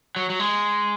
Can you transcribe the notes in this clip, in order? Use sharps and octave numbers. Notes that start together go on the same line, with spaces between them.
F#3
F#3
G#3